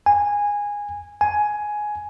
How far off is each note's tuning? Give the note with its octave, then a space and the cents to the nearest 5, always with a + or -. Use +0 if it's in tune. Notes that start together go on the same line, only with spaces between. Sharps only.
G#5 -15
G#5 +10